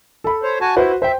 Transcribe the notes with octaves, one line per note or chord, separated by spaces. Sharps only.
A4 B5
C5 C#5
F#4 G#5 A5
E4 F#4 B4 C5
C5 E5 G5